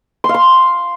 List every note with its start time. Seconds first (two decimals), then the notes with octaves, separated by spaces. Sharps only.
0.24 C6
0.29 F5
0.34 C6